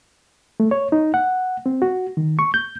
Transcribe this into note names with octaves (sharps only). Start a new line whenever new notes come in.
A3
C#5
D#4
F#5
C4
F#4
D#3
C#6
G6